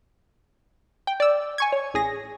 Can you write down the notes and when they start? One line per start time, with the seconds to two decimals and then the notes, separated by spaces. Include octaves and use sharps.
1.07 G5
1.20 D5 E6
1.58 G#5 C#6 G#6
1.72 C#5
1.94 A1 G#4 A#6